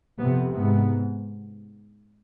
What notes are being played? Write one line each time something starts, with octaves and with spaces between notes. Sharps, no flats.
F2 C3 B3
G#2 B3